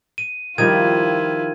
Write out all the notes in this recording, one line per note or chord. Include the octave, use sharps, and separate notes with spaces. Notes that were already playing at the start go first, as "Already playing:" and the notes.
D#7
D#3 F3 G3 E4 F4 G#6 D#7